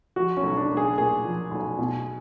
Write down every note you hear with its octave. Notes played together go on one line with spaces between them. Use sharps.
F3 F#4
C#4
B1
D4
B1
G#4
A#2 G#4
F3
B1
B2